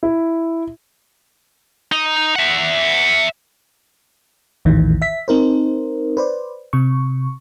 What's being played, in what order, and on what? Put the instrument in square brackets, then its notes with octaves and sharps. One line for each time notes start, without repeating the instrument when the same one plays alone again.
[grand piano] E4
[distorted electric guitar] D#4
E5 F#5
[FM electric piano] A#1 E2 A2 D#3 E3
E5 B6
C4 D#4 A#4 C5
B4 C5 D5
C3 C#6